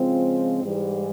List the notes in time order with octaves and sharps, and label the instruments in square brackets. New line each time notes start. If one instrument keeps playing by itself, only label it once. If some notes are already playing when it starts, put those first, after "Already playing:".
Already playing: [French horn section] C#3 F3 G#3 C4 F4
G#2 E3 G3